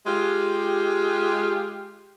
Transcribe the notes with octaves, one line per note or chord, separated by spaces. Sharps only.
G#3 F4 G4